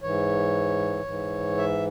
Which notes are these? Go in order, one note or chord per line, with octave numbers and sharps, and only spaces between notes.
G#2 E3 C#5
G#2 E3
E5